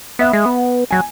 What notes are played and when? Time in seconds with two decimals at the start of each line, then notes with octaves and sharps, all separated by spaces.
0.19 B3 E5
0.33 G#3
0.46 B3
0.91 F#3 G#5